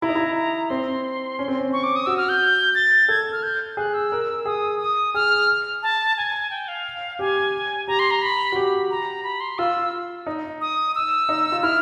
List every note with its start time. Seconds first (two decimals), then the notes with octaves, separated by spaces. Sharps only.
0.02 E4 A#5
0.09 D#4
0.15 E4
0.36 A#5
0.69 C4 C6
1.39 C#4
1.48 C4
1.58 C#4
1.73 C#6
1.83 D6
1.96 D#6
2.06 F#4 E6
2.17 F6
2.29 G6
2.75 A6
3.09 A4 G#6
3.32 F6
3.43 G6
3.77 G#4 F#6
3.94 E6
4.12 A#4
4.45 G#4 D#6
4.80 D#6
5.14 G#4 F6
5.83 A5
6.17 G#5
6.50 G5
6.68 F5
7.19 G4 G#5
7.87 G4 A#5
7.99 C6
8.11 A#5
8.22 B5
8.52 F#4
8.56 G4
8.90 A#5
9.23 B5
9.40 C6
9.58 F4 E6
10.27 D#4
10.61 D#6
10.95 E6
11.29 D#4
11.52 F4
11.62 E4 F6